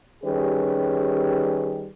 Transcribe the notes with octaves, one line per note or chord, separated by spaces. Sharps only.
D#3 G3 C#4 G4 G#4 B4